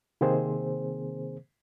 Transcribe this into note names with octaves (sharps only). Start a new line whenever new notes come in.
C3 D#3 A#3 C4 G#4 C5